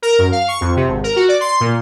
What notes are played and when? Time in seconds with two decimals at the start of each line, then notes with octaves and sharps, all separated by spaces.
0.02 A#4
0.19 F#2
0.32 F5
0.48 C#6
0.61 F2
0.76 C3
0.88 G#1
1.04 A#4
1.16 F#4
1.29 D5
1.41 C6
1.60 A#2